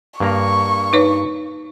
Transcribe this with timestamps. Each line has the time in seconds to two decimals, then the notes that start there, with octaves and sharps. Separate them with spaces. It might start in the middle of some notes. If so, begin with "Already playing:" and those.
0.20 G2 A#3 A#5 C#6
0.93 D#4 B4 C#5